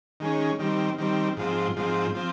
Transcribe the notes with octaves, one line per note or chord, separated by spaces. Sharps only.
D#3 G#3 C#4
D#3 G3 C4
D#3 G3 C4
G#2 F3 C4
G#2 F3 C4
F3 C4